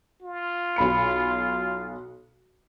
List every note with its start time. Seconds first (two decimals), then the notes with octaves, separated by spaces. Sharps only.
0.23 F4
0.76 B1 B5 C#7